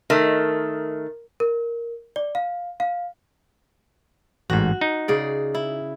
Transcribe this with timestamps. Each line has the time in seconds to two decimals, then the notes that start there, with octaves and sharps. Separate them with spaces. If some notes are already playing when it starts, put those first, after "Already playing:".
0.10 D#3 A3 A#4
1.40 A#4
2.16 D5
2.35 F5
2.80 F5
4.50 A1 G#2 F#4
4.81 D#4
5.08 C#3 G#4 D5
5.55 E4